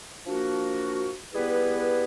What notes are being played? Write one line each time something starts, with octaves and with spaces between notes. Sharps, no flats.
F3 A#3 D4 F#4 A#4
G3 B3 E4 G#4 B4